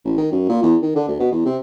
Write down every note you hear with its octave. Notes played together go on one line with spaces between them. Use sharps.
A1
D#3
F#2
A#2
E2
D#3
D3
D2
B2
E2
C3